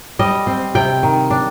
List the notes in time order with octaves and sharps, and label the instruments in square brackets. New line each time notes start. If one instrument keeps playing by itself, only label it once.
[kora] G3 D#5
C4
C3 G5
D#3
D4